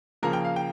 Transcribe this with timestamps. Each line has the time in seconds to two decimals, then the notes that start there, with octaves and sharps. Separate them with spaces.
0.23 C#3 F3 A#3 A#4
0.33 G5
0.44 F5
0.56 G5